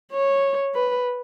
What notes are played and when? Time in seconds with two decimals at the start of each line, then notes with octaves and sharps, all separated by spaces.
0.13 C#5
0.75 B4